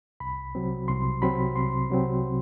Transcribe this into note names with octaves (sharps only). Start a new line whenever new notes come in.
C2 B5
C3 F#3 C4
C2 C6
C3 F#3 C4 B5
C2 C6
C3 F#3 C4